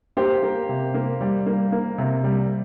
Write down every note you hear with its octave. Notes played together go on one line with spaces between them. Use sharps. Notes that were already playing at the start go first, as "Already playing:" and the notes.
A#3 G4 C5
A#3
C3
A#3
G3
A#3
A#3
C3
G3